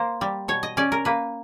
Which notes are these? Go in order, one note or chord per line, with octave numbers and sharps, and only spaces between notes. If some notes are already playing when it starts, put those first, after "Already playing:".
Already playing: A#3 C5
G3
B2 C#5
D#5
C#4 D5
A#4
A#3 B4